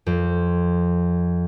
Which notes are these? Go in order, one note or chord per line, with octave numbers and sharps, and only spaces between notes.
F2